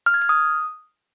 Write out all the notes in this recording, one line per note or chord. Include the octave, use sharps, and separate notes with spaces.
F6
G#6
F6
D#6